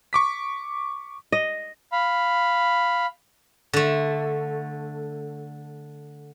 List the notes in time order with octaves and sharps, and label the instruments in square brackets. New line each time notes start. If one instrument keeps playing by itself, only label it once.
[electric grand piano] C#6 D6 B6
[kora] D#5
[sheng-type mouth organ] F5 B5
[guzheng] D3 A3